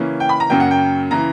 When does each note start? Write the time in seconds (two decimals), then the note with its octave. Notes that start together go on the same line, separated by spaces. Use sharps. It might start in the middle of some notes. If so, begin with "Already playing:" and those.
Already playing: C#3 E3 A#3 C#4
0.20 G5
0.29 B5
0.40 A#5
0.50 F#2 C#3 F#3 A#3 G5
0.60 F#5
0.71 G5
1.11 C#3 E3 A#5